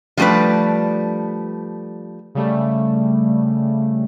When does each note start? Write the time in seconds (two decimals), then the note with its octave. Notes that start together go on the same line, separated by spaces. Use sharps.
0.17 F3 G3 A3 D4 B4
2.35 C#3 G3 A3